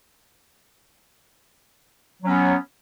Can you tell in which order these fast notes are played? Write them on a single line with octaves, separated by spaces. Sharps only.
F#3 C#4 B3